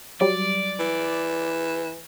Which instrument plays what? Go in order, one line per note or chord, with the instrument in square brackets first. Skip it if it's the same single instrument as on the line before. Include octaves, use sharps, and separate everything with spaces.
[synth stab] F#3 G3 [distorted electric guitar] D5
[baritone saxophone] E3